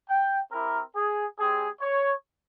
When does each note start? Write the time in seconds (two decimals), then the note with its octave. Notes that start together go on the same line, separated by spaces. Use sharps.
0.09 G5
0.52 C4 E4 G4 A#4
0.95 G#4
1.38 G3 C4 G4 G#4
1.81 C#5